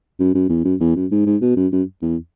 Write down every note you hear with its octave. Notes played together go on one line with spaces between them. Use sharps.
F#2
F#2
E2
F#2
E2
F#2
G#2
G#2
B2
F#2
F#2
E2